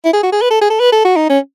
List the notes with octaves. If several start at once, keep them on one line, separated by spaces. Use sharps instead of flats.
E4
G#4
F#4
G#4
B4
A4
G#4
A4
B4
A4
F#4
D#4
C#4